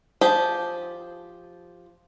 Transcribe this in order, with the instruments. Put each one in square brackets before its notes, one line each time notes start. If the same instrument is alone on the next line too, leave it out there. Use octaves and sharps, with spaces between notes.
[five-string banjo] F3 G4 G#4